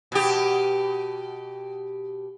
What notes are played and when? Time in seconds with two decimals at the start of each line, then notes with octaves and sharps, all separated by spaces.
0.12 B2 G4